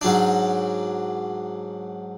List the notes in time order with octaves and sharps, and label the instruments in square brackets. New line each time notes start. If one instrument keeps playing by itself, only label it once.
[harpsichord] G#2 F#3 D4